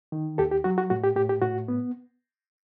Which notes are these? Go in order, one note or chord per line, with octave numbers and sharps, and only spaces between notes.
D#3
D#2 G4 A4
G4
F#3 F#4
F#4
A2 F#4
G4
A2 G4
G4
A2 F#4
B3